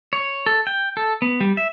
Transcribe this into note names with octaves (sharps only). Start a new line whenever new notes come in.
C#5
A4
G5
A4
B3
G3
E5